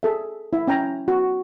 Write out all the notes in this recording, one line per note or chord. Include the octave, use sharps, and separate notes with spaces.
G#4 A4 E5
E4 E5
C#4 G5 G#5 A#5
F#4